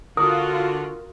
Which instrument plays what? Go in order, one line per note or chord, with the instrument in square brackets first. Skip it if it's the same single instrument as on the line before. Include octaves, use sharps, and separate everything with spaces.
[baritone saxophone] D3 [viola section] F4 F#4 [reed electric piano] A#4 [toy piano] D#6